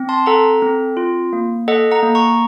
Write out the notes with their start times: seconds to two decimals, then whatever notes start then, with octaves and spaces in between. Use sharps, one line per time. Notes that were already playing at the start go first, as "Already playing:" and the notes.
Already playing: C4
0.09 A5 C6
0.26 A4 F#5 A#5
0.62 C4
0.97 F4
1.33 A#3
1.68 A4 D#5 F#5
1.91 F#5 A#5
2.03 A#3
2.15 A#5 C#6